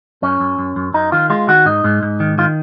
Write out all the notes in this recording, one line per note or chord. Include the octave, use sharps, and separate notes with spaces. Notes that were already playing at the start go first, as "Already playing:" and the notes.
F#2 C#4
F#2
F#2
F#2
F#2 D#4
D#3 F4
G#3 F4
D#3 F#4
G#2 D#4
G#2
G#2
D#3
D#3 F4